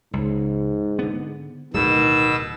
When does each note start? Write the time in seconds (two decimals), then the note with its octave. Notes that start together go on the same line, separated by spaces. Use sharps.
0.13 C#2 G#2
0.99 D3 B3
1.74 D1 B2 D#3 A3 E6